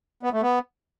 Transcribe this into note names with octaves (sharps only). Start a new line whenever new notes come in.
B3
A3
B3